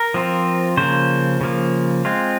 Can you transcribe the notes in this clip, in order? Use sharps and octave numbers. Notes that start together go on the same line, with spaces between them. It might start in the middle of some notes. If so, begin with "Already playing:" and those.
Already playing: A#4
F3 C4 F4
C#3 F3 A#3 C5
C#3 F3 A#3
G#3 C4 F4